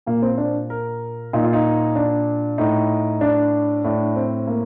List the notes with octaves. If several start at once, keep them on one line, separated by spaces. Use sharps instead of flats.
A#2 A#3
C4
D4
A#4
A#2 D#4
F4
D#4
D4
A2 D#4
D4
A2 D4
C4
A#3